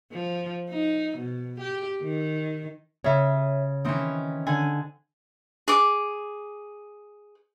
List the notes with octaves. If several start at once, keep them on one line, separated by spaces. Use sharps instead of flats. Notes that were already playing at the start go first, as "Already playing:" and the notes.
F3
D#4
B2
G4
D#3
C#3 C#5 E5
D#3 E3 C4 C#4 D#4
D3 G#5
G#4 D6